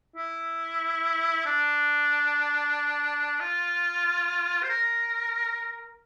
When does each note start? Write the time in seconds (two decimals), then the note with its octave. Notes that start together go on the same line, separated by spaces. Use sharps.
0.16 E4
1.46 D4
3.41 F4
4.63 C5
4.70 A#4